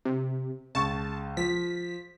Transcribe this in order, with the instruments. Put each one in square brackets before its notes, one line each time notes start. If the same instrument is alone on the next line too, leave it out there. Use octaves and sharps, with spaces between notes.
[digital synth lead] C3
[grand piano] C#2 C#6 [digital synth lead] A5
[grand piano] F3 [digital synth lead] B6